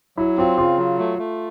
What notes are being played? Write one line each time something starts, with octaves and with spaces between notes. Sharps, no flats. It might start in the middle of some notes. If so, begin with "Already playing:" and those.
F#3 E4
C4 F4
C#3 F4
F#3
A3
A3